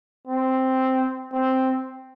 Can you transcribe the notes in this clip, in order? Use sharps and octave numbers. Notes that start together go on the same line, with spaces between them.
C4
C4